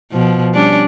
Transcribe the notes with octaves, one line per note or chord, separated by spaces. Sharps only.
B2 F3
G3 C#4 D4